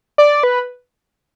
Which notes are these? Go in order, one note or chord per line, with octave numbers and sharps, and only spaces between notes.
D5
B4